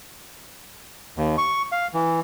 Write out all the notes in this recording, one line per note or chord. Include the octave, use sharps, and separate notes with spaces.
D#2
C#6
F5
E3